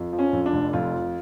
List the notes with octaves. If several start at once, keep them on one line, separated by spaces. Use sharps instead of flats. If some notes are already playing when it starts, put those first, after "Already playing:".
Already playing: F2
F3
C#4
F2
D4
F1
F2 F4
F3